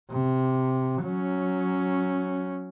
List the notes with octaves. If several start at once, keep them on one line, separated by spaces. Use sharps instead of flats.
C3
F#3 C#4